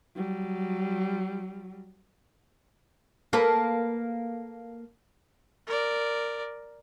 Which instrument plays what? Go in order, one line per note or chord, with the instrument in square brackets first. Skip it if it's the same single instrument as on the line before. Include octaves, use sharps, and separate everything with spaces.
[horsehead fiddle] F#3 G3
[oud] A#3 A4 B4
[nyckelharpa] A#4 D5